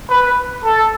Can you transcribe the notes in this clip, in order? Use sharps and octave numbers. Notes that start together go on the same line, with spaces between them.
B4
A4